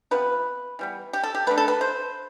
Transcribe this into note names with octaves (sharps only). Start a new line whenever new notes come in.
C3 F3 B3 B4
E3 G3 B3
G4
A4
G4
D3 A3 B4
A4
B4
C5